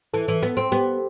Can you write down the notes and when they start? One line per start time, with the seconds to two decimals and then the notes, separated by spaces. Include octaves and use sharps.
0.14 E3 A4
0.28 E3
0.43 B3
0.57 C4
0.72 B3 G4